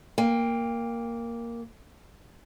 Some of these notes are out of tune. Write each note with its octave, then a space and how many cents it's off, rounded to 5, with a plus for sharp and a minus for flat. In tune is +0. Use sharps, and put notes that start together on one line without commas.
A#3 +0 G5 +30